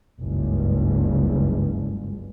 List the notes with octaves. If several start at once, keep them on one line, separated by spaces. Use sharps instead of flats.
F#1 C#2 G2